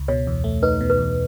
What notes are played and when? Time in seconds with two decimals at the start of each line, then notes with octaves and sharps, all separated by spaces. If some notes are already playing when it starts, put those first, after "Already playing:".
Already playing: C#2
0.08 B2 C#5
0.27 E2
0.44 A3
0.63 D#4 B4
0.81 B2
0.90 B4
0.98 E2